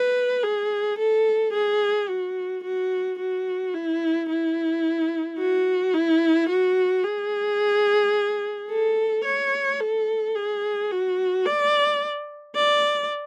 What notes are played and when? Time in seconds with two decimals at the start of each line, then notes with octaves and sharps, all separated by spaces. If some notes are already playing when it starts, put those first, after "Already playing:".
Already playing: B4
0.43 G#4
0.99 A4
1.53 G#4
2.08 F#4
2.64 F#4
3.19 F#4
3.74 E4
4.29 E4
5.39 F#4
5.94 E4
6.49 F#4
7.04 G#4
8.70 A4
9.25 C#5
9.80 A4
10.36 G#4
10.91 F#4
11.45 D5
12.55 D5